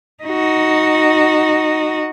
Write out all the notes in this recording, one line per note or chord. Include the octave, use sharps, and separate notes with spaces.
D#4 F#4